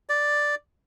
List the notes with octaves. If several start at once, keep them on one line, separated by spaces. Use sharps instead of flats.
D5